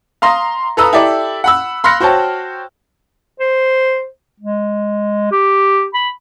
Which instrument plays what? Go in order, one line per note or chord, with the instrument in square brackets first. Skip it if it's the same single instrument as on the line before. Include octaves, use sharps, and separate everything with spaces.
[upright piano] F5 A#5 C6 D#6 A#6
A4 B4 A#5 B5 D#6 E6
E4 G4 A4 D5
F#5 B5 E6
B5 C6 F6 F#6 A#6 C#7
F#4 C5 C#5 G5 A5
[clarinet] C5
G#3
G4
B5